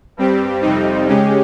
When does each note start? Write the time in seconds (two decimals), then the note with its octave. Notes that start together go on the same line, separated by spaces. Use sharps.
0.17 G2 G3 C4 G4
0.61 F2 C3 G3 C4 D#4
1.07 C#3 G#3 C#4 G4